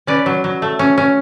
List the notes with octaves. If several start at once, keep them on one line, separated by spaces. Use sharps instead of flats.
C#4 B4 D5
F#3
F#3
A3
C#4
C#4